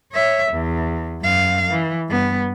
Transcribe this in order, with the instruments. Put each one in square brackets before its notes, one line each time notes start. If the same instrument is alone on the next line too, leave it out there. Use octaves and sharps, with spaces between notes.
[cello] C#5 E5
E2
F#2 F5
E3
G2 B3